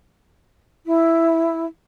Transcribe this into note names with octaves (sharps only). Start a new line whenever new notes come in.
E4